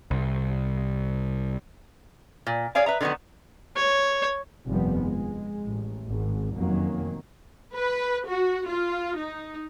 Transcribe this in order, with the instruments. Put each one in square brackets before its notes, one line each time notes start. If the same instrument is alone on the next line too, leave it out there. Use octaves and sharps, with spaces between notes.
[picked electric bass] C2
[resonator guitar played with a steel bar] A#2
G#4 C#5 D5 F5 G#5
B4 E5 A#5
D3 D#3 F#3 B3 D#4
[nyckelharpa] C#5
[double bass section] F1 G2 D#3 F3 G3 B3
G#3
A1
G#1
F1 F#2 D#3 F#3 A#3
[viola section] B4
F#4
F4
D#4